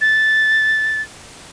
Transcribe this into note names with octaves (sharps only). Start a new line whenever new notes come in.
A6